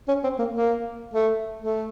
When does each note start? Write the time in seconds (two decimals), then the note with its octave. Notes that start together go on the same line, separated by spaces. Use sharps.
0.08 C#4
0.24 C4
0.39 A#3
0.54 A#3
1.14 A3
1.59 A3